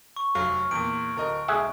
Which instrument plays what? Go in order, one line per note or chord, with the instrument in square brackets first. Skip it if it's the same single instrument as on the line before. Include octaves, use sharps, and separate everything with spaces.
[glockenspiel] C#6
[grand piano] F1 F#3 F5 [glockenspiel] C#6 F6
[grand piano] E2 A#2 [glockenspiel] D7
[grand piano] D1 A#4 D#5
[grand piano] B1 G#3 [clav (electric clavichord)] G#4 E5 F#5